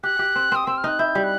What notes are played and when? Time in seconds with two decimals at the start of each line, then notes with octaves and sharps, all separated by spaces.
0.03 G4 F#6
0.19 G4
0.35 C4
0.52 C4 D#6
0.66 C4 E6
0.78 F6
0.84 D#4 F#6
0.99 E4 G6
1.15 G3
1.24 F#6